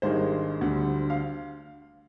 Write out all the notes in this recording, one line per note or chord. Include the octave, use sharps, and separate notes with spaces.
G#1 G2 D#3 G#3 C5
D2 D3 G3
F5